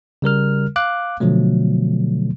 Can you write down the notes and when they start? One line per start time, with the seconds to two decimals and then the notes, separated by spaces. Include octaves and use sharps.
0.22 C#3 G3 A#4 F6
0.76 F5 D6 F#6
1.20 B2 D3 F3 F#3 A3